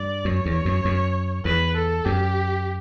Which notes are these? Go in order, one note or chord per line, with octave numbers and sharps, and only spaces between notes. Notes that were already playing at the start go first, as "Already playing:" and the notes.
Already playing: G2 D5
F#2 C#5
E2
F#2
F#2
E2 B4
A4
F#2 G4